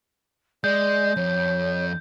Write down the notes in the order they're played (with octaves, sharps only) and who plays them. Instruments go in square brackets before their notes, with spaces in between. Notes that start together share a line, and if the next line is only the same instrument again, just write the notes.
[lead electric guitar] G#3 [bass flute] D5 [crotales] G6
[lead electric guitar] F2 [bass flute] C#5